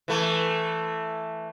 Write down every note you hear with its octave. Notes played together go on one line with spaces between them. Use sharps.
E3 A3